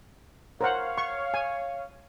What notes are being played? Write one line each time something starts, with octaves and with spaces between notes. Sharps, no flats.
A#4 C5 C#5 F5 F#5
C#6
G#5